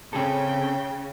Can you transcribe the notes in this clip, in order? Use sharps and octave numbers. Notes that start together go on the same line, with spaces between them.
C#3 C4 G#4 A4 G5